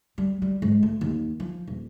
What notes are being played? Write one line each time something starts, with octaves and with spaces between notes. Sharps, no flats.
G3
G3
G#2
A3
D#2
F3
D#1